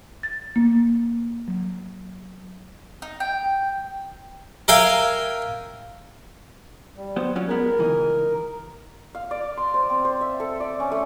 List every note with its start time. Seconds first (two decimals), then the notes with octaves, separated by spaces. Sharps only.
0.23 A6
0.56 A#3
1.48 F#3
3.02 D#4
3.20 G5
4.68 A#4 E5 F5 G5 G#5
6.97 G3
7.16 F#3 B3 C5
7.35 F#3 C#4 F4
7.49 G#3 B3 A#4
7.78 C#2 E3 D#4
9.15 F5
9.31 D5
9.57 C6
9.74 C5
9.90 C4
10.05 C5
10.21 E5
10.40 A4
10.60 D5
10.80 C#4
10.91 A3